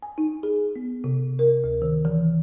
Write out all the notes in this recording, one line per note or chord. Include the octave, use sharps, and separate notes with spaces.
G#5
D#4
G#4
B3
C3
A#4
D2
D#3
E3